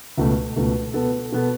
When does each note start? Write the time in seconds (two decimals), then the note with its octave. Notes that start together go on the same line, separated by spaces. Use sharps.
0.17 C#2 B2 A3
0.56 C#2 B2 A3
0.93 B2 B3 A4
1.32 B2 B3 A4